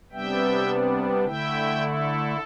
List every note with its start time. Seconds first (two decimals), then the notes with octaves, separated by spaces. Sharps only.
0.11 C3 G3 B3 D4 E5 G5
1.24 D3 A3 E4 E5 G5
1.81 A4